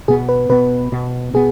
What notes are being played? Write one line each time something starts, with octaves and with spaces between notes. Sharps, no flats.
B2 B3 G#4
B4
B2 B3 B4
B2 B3
B2 B3 G#4